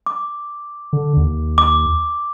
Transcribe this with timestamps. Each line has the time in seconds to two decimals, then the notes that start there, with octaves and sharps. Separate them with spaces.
0.06 D6
0.93 D3
1.17 D#2
1.58 D6